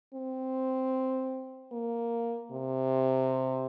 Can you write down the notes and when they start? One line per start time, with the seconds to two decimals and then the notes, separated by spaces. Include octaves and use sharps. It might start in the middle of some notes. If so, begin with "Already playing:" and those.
0.14 C4
1.72 A#3
2.51 C3